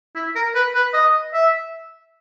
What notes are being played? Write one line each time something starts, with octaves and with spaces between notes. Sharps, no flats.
E4
A#4
B4
B4
D#5
E5